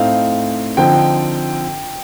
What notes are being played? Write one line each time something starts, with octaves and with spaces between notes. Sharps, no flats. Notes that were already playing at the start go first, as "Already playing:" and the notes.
Already playing: A2 A3 C4 D#4 F5
D3 F3 C4 D#4 G5